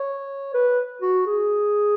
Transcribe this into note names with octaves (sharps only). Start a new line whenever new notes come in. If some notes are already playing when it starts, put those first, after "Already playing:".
Already playing: C#5
B4
F#4
G#4